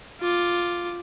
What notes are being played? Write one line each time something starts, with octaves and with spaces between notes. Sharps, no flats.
F4 D6